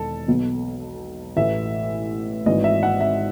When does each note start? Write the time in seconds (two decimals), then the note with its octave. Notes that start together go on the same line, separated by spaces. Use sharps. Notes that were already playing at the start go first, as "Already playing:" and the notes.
Already playing: E1 E2 D#3 A4
0.27 B1 B2
1.36 A1 A2 E3 E5
2.46 G#1 G#2 E3 D#5
2.64 E5
2.83 F#5
3.01 E5